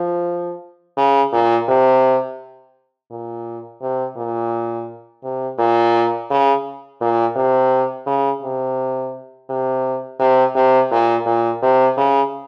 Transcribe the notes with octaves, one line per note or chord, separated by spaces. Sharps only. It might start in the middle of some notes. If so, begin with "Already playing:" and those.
Already playing: F3
C#3
A#2
C3
A#2
C3
A#2
C3
A#2
C#3
A#2
C3
C#3
C3
C3
C3
C3
A#2
A#2
C3
C#3